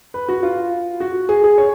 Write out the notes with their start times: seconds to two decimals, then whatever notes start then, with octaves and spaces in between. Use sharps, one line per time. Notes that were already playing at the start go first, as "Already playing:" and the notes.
0.14 B4
0.29 F#4
0.43 F4
1.00 F#4
1.29 G#4
1.44 G#4
1.58 C#5